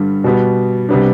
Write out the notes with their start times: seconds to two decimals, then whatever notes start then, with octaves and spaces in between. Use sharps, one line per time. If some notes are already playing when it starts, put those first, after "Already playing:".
Already playing: G2 D3 G3
0.24 B2 G3 B3
0.89 C3 G3 B3 D4